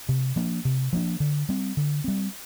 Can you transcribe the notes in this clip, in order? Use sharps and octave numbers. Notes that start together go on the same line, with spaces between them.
C3
F3 A#3 D4
C3
F3 A#3 D4
D3
G3 C4
D3
G3 C4